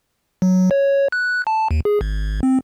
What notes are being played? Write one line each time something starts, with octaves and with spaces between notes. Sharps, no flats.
F#3
C#5
F#6
A5
D#2
G#4
G#1
C4